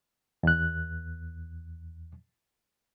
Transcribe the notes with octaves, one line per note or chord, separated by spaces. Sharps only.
E2 F#6